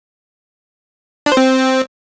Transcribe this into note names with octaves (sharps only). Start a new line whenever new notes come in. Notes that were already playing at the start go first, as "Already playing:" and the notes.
D4
C5
C4